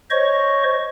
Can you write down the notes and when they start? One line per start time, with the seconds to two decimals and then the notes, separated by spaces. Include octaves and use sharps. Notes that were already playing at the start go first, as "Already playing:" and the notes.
0.10 C5 C#5 D#5 C#6